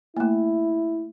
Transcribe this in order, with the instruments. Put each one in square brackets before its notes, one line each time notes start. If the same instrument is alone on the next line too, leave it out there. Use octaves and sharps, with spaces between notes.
[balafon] A3 A#3 [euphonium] E4